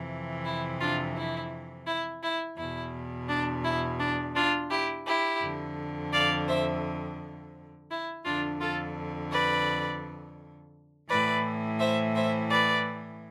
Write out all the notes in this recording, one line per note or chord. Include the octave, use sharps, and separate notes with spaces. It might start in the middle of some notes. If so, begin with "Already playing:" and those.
Already playing: F2 C3 E3
E4
D4 F4
E4
E4
E4
E2 B2 E4
D4
E4
D4
D4 F4
E4 G4
E4 G4
F2 D3
D5 F5
C5 E5
E4
F2 D3 D4 F4
F4 A4
B4 D5
A2 E3 B4 D5
C5 E5
C5 E5
B4 D5